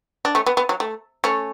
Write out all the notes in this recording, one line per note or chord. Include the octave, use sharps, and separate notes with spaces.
D4
A3 C#4
B3
B3
F#3
A3
A3 C#4